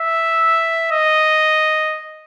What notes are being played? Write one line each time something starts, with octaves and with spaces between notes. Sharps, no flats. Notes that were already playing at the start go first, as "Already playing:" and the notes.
Already playing: E5
D#5